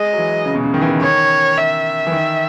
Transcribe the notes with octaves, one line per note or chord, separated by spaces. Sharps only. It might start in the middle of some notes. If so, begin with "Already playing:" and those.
Already playing: G#3 D#5
F#3
E3
C#3
B2
C#3
D#3
E3
D#3
D#3 C#5
E5
E3
D#3